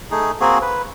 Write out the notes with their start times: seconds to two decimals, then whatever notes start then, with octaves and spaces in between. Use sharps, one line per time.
0.11 A3 D#4 G#4
0.40 A#3 C4 F#4 G#4
0.62 B4